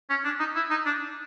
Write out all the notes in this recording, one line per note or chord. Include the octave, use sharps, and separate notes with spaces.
C#4
D4
D#4
E4
D#4
D4